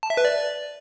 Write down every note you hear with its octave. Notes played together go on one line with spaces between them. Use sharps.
A5
E5
B4
D5